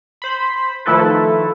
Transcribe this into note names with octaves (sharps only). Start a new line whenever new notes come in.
C5 B5
D#3 F3 A3 E4 A4 B4